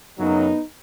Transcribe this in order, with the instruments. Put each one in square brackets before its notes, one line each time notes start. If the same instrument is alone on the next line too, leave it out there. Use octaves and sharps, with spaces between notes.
[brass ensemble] F#2 C#3 F#3 B3 D#4